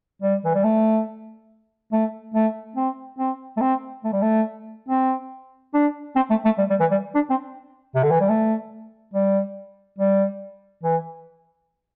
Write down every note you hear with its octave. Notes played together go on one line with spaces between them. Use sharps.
G3
E3
G3
A3
A3
A3
C4
C4
A3
C4
A3
G3
A3
C4
D4
C4
A3
A3
G3
G3
E3
G3
D4
C4
C3
D3
E3
G3
A3
G3
G3
E3